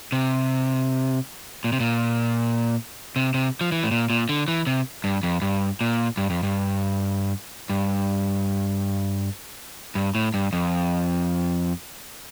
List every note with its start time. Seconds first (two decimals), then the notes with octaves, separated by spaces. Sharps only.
0.12 C3
1.64 A#2
1.72 C3
1.80 A#2
3.16 C3
3.34 C3
3.61 F3
3.72 E3
3.84 A2
3.91 A#2
4.10 A#2
4.29 D3
4.48 E3
4.67 C3
5.04 G2
5.23 F2
5.42 G2
5.81 A#2
6.17 G2
6.30 F2
6.43 G2
7.70 G2
9.95 G2
10.15 A2
10.34 G2
10.53 F2